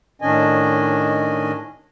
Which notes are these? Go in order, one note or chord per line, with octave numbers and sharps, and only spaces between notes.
A2 D#3 C#4 D4 D#5 G#5